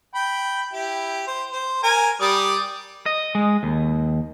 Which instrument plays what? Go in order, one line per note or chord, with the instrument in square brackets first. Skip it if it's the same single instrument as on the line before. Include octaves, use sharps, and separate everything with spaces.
[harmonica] G5 B5
E4 G4
C5
C5
A#4 G#5
G3 D5 D#6
[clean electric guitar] D#5
G#3
D#2